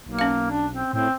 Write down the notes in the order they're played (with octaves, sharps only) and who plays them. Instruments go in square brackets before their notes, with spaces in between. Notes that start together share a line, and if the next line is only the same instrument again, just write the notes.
[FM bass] B1 [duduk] A#3
[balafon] C#4 F5
[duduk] D4
C4
[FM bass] A2 [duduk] C4